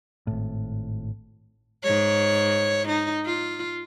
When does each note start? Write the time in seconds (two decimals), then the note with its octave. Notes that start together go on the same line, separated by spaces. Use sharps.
0.27 G#1 A2
1.83 G#2 C#5
2.88 D#4
3.25 F4